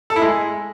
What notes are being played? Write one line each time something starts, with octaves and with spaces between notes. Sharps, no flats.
A4
E4
G#3